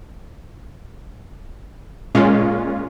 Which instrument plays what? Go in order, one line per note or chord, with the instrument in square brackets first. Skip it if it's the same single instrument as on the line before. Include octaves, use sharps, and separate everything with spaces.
[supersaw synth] A#2 G#3 C#4 F4